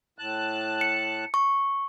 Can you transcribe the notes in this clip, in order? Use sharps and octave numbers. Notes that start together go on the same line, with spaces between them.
A2 A5 F#6
C#7
C#6